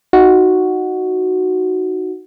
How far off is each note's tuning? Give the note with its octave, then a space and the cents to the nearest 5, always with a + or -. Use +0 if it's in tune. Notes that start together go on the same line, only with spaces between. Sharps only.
D#4 +0 F#4 +0